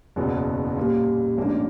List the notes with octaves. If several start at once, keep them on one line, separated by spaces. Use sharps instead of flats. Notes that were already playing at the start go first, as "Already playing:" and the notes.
F#1 E2 B2 F#3 B3
A#2 G3 A#3
A1 G#2 F3 A#3 D4